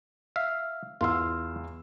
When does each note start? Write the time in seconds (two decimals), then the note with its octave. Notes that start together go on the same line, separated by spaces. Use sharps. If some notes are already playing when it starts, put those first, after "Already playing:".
0.36 E5 F5
1.01 E2 F4 F5 C6 E6